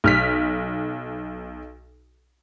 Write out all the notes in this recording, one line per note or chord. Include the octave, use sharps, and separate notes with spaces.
B1 F6 B6